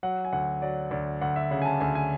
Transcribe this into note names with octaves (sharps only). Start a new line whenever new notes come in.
F#3 F#5
G#5
D2 F#5
F#3 D5
D2 D5
D2 F#5
E5
C#3 F#5
G#5
A5
D2 G#5
G#5